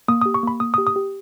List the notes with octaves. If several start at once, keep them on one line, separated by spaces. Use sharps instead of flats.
A#3 D#6
G4 D#6
C#6
A#3 B5
A#3 D#6
D#6
G4
D#6
G4